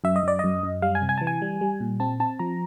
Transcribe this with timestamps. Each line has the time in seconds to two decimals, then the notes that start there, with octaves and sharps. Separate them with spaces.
0.04 F#2 E5
0.16 D#5
0.23 F#2 D5
0.39 F#2 D#5
0.63 F#2
0.82 G3 F5
0.95 G#5
1.02 C3
1.09 G#5
1.18 E3 A5
1.27 G#5
1.42 G3
1.61 G3
1.80 A#2
2.00 C4 A5
2.20 C4 A5
2.39 F3 A#5